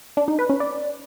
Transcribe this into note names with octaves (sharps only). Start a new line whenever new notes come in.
D4
D#4
B4
C#4
D5